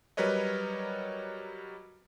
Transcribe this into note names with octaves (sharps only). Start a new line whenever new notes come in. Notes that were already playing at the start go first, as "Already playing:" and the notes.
F#3 G3 A#4 B4 C#5 D#5